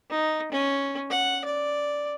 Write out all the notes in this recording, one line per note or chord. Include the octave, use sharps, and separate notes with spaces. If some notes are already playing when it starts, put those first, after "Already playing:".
D#4
C#4
F#5
D5